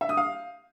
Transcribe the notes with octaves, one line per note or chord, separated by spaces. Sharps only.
E5
D#6
F5